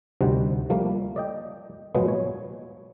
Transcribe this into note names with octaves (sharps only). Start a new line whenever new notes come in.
D2 C3 D#3 G3 C5 F#5
F3 G3 A3 A#3
D5 D#5 G5
A#2 F3 F#3 G#3 B3
C#5